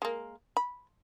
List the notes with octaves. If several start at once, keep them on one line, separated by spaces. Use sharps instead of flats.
G#3 A#3
B5